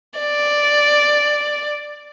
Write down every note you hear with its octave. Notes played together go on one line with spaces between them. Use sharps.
D5